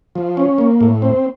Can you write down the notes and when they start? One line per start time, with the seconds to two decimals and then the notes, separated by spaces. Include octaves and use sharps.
0.15 F3
0.37 C#4
0.58 A#3
0.81 A2
1.02 C4